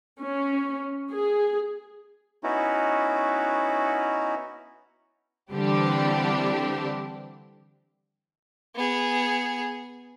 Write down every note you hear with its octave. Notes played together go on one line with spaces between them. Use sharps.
C#4
G#4
B3 C#4 D#4 E4 F#4
D3 E3 G3 C4 D4 G4
B3 G#4